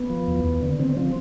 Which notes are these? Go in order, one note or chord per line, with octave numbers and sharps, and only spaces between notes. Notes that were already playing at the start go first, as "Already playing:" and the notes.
Already playing: B3
F3
E2
E2
D3
D3 C4
F3 C4